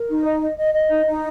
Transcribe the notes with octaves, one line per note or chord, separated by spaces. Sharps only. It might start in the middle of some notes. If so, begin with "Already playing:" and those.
Already playing: A#4
D#4
D#5
D#5
D#5
D#5
D#4
D#4